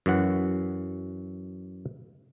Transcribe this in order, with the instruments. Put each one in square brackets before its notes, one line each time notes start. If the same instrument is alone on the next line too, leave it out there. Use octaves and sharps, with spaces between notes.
[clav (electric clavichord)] F#2 E3 F#5